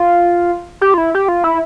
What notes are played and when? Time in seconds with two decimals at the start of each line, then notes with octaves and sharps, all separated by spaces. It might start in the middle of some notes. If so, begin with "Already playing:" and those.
Already playing: F4
0.81 G4
0.94 F4
0.98 E4
1.15 G4
1.28 F4
1.44 E4